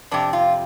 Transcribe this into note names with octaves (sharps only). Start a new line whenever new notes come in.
F2 C3 D4
F4